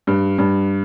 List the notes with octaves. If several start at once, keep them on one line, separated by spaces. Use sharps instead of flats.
G2
G2